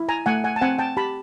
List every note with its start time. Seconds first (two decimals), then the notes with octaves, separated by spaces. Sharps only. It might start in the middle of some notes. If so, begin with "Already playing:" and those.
Already playing: E4
0.09 G#5 A#5
0.26 A3 F#5 G#5
0.44 F#5 G#5
0.56 A5
0.61 C4 F#5 G#5
0.79 G5 A5
0.97 G4 A5 B5